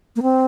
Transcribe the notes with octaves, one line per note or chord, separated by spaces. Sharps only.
A#3
C4